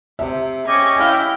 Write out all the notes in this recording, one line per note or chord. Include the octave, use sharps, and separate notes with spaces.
C3 E5
C#4 G4 D#5 G#5 C#6 D6
E4 E5 F5 G5